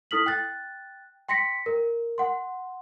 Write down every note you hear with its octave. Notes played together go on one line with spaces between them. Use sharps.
E4 A4 D#6 F6 B6 F#7
G5 F#6 A6
G5 C6 A#6 B6 C#7
A#4
F#5 C6